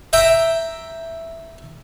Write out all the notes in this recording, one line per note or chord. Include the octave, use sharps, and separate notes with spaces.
E5 G5 A#5